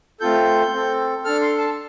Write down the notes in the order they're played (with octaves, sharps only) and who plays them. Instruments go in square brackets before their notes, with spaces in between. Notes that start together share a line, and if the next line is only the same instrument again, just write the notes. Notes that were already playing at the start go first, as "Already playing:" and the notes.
[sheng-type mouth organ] A3 C4 F4 A4 G6
C4 A4
D4 A4 F6
C6
A5